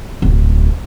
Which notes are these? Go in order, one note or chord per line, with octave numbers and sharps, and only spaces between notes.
D1 B1